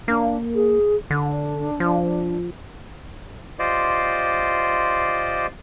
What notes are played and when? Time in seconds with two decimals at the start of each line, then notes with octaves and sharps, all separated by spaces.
0.08 A#3 D4
0.55 G#4
1.11 D3 D4
1.80 F3
3.59 F4 G4 C5 D5 D#5